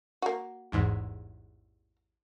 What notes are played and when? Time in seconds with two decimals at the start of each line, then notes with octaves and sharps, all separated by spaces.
0.22 A#3 F#4
0.72 A1 E2 G#2